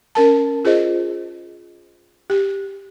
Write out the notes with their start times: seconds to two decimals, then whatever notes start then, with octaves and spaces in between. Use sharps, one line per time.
0.15 C#4 A#4 A5
0.65 F4 G#4 C5 D#5
2.30 G4